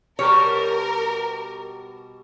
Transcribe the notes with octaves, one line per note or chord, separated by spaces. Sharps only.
B2 G3 A#4 C#5